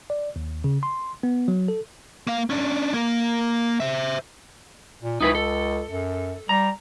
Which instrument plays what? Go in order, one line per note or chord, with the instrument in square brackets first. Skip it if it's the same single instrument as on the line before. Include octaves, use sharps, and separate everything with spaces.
[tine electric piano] D5
D#2
C#3
C6
B3
F#3
A4
[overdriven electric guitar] A#3 F5
C#4 D4
A#3 A#4
C5 E5
[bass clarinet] A#2
[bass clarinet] C#2 [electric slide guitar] D#4 E4 B4
[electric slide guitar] A4
[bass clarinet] F#2
[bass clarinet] G3 [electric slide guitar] A#5